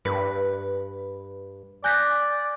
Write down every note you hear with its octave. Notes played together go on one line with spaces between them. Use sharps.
G2 B4
D5 G#5 F#6 G6 A#6 B6